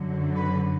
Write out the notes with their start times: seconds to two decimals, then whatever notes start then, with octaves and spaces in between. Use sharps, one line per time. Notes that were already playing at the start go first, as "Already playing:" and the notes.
Already playing: F#2 D3 F#3
0.36 B4